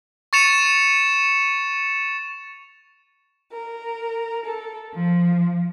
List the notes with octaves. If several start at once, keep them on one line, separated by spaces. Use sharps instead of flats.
C#6 A6 C#7 E7 F7
A#4
A4
F3